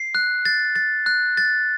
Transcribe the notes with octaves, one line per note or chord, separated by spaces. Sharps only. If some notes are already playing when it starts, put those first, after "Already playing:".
Already playing: C7
F#6
A6
A6
F#6
A6